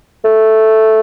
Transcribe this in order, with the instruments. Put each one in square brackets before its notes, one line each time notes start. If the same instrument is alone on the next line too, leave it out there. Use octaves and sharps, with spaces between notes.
[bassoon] A3